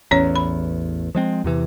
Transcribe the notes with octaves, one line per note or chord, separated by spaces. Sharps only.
A1 E2 C#4 C#5
B5
F3 G#3 C4
E2 C3 E3